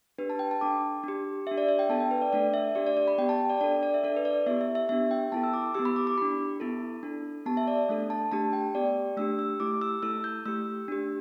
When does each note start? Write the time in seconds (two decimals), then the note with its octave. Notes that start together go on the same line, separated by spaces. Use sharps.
0.18 D4 G4 B4
0.30 A5
0.39 G5
0.51 A5
0.61 D4 A4 D6
1.03 D4 G4
1.47 D4 G4 E5
1.58 D5
1.68 E5
1.79 G5
1.89 B3 D4 A4 A5
2.00 G5
2.11 B4
2.22 D5
2.33 A3 D4 A4 D5
2.54 E5
2.75 D4 G4 D5
2.87 D5
2.97 D5
3.08 B5
3.18 B3 G4 G5
3.29 A5
3.40 G5
3.50 D5
3.61 D4 A4 D5
3.83 D5
3.94 E5
4.03 D4 A4 D5
4.17 B4
4.25 D5
4.46 B3 E4 G4 E5
4.61 E5
4.75 E5
4.89 B3 D4 G4 E5
5.11 G5
5.32 B3 E4 A4 A5
5.43 E6
5.54 D6
5.75 B3 E4 G4 E6
5.85 B5
5.96 D6
6.07 D6
6.18 D4 G4 B5
6.60 B3 E4 A4
7.03 D4 A4
7.46 B3 G4 A5
7.57 E5
7.68 D5
7.89 A3 D4 A4
8.10 A5
8.32 A3 D4 G4 A5
8.53 G5
8.74 B3 G4 D5
9.17 A3 D4 G4 E6
9.39 E6
9.60 A3 E4 G4 D6
9.81 E6
10.03 A3 E4 A4 E6
10.24 G6
10.46 A3 G4 E6
10.88 D4 G4